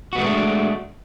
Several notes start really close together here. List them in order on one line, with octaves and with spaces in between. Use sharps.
F#4 B3 G#3 A3 D4